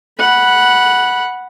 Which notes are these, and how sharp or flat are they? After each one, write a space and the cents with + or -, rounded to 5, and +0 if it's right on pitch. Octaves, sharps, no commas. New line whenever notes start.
F#5 +0 B5 -15